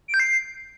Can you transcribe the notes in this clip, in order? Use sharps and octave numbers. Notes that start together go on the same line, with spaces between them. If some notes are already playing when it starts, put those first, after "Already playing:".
D7
G6
C7